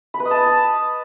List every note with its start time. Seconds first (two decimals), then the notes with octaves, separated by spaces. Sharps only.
0.14 B5
0.20 B4
0.25 D#5
0.31 A5